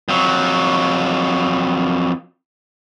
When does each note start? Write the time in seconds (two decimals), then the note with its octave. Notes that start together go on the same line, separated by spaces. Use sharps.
0.08 F2 F#3